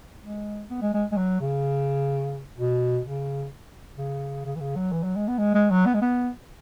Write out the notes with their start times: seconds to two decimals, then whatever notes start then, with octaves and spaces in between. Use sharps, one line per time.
0.22 G#3
0.70 B3
0.82 G#3
0.94 G#3
1.12 G#3
1.17 F#3
1.40 C#3
2.58 B2
3.05 C#3
3.98 C#3
4.45 C#3
4.56 E3
4.60 C#3
4.76 F#3
4.92 E3
5.03 F#3
5.16 G#3
5.28 B3
5.38 G#3
5.54 G#3
5.71 F#3
5.86 B3
5.94 G#3
6.01 B3